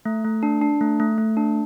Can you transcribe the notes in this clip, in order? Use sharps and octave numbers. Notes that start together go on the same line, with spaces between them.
A3
A3
D4
D4
A3
A3
A3
D4